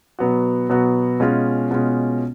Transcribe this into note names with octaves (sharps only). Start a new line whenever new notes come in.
B2 F#3 B3 F#4
B2 F#3 B3 F#4
B2 G#3 C#4 F4
B2 G#3 C#4 F4